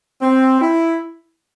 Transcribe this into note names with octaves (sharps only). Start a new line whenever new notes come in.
C4
E4